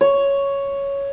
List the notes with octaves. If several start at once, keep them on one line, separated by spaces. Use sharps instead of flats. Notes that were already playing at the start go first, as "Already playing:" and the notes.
C#5